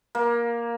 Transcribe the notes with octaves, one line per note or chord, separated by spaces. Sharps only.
A#3